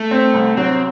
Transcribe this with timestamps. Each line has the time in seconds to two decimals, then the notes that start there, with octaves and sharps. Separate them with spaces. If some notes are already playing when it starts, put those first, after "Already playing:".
Already playing: A3
0.11 C4
0.34 C2
0.57 F#3 C4